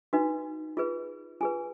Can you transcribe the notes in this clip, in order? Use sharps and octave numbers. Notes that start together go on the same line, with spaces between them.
D#4 F#4 B4
F4 G#4 B4
F4 G#4 B4 G#5